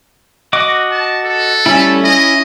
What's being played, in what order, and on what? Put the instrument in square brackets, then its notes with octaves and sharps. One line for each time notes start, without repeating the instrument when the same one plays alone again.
[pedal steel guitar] F#4 D#5 D6
[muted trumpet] A5
A4
[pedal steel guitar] G3 A3 E4 [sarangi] C#4
[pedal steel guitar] E4 [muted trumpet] D#5